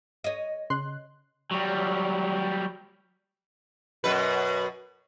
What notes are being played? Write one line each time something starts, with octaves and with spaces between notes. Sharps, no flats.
C#5 D#5
C#3 C6 F#6
F#3 G3
F#2 B2 B4